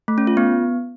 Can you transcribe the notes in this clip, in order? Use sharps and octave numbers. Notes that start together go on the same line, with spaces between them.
A3
C#4
F4
B3